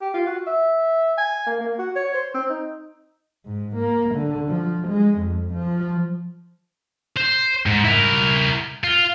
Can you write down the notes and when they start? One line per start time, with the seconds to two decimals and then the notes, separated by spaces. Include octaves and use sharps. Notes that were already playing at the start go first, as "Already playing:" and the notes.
0.01 G4
0.14 F4
0.27 F#4
0.47 E5
1.18 G#5
1.46 A#3
1.60 A#3
1.79 F#4
1.95 C#5
2.14 C5
2.34 C4
2.50 D#4
3.45 G#2
3.76 A#3
4.14 D3
4.48 F3
4.88 G#3
5.19 F2
5.53 F3
7.17 C5
7.66 G#2
7.84 E4 A#4
8.84 F4